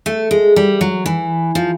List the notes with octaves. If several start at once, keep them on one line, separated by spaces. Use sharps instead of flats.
A3
G#3
G3
F#3
E3
F3